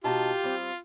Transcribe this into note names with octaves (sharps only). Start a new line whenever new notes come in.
B2 D#4 F4 G4 A5
G3 C4